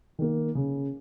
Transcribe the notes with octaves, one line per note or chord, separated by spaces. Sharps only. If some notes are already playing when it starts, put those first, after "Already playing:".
D#3 A#3
C#3